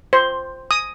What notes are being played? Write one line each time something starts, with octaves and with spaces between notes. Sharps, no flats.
C5
D#6